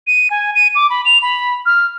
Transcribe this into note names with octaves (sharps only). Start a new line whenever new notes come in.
D#7
G#5
D#7
D6
B5
F7
B5
F6